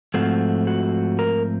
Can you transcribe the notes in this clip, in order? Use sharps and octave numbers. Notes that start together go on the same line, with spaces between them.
G#2 F3 A3 C4 F#4
F#4
A#4